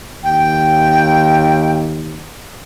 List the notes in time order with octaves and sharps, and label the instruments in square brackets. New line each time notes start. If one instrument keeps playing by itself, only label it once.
[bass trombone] D#2 [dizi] G5